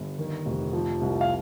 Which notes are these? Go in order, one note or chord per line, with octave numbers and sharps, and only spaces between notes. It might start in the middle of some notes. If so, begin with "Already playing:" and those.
Already playing: G1
D#3
F1
F3
C2
F5